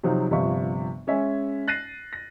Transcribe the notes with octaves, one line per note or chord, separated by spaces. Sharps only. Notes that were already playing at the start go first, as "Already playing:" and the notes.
C3 F3 F#3 C4 D#4 F4
G1 C3 F3 E5 C#6
G#3 C#4 E5 G#5
F#6 A6 A#6 C7 D#7
A#6